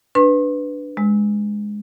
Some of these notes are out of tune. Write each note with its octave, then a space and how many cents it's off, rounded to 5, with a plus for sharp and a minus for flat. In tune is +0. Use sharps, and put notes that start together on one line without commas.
D4 +0 B4 +5 C6 +45
G#3 +0 E6 -30